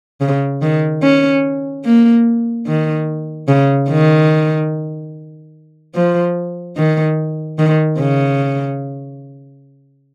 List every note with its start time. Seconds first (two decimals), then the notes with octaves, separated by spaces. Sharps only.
0.21 C#3
0.62 D#3
1.03 C#4
1.85 A#3
2.66 D#3
3.48 C#3
3.90 D#3
5.94 F3
6.77 D#3
7.59 D#3
7.99 C#3